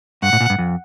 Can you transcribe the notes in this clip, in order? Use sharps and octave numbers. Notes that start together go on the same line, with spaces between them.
G2 F#5
A2
A#2
G2
F2